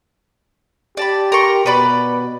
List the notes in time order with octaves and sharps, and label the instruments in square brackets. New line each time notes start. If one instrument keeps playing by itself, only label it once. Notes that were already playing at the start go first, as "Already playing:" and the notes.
[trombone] G4 [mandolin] D5 A5 B5
[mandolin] A#4 C6 C#6
[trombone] B2 [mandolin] B4 D5 B5